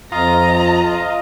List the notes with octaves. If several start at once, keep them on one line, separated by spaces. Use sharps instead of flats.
F2 F4 D#5 A#5